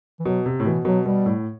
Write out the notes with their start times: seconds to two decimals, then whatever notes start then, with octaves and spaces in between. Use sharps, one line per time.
0.20 E3
0.25 B2 F#3
0.46 C3
0.60 A2
0.66 B2 E3
0.85 B2 F#3
1.05 B2 G3
1.26 A2